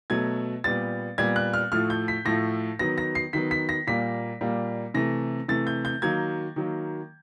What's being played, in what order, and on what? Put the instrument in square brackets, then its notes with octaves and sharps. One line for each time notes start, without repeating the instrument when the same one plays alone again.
[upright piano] B2 F#3 A3 G#6
A#2 G3 B3 A6
A#2 G3 B3 G#6
F#6
F6
A2 F3 A3 F6
G6
B6
A2 F3 A3 A#6
D#3 F#3 B3 A#6
A#6
C7
D#3 F#3 B3 B6
B6
A#6
A#2 G3 A#3 B6
A#2 G3 A#3
C3 E3 A3 A#6
C3 E3 A3 A6
G6
G6
D#3 F#3 A#3 G#6
D#3 F#3 A#3